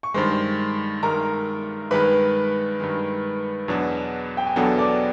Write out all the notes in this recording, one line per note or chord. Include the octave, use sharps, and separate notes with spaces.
C#6
G2 D#3 G#3 C5 C6
G2 D#3 G#3 A#4 A#5
G2 D#3 G#3 B4 B5
G2 D#3 G#3
E2 B2 F#3 B3 D4
G5
G#5
E2 B2 F#3 B3 D4 A4 A5
D5 D6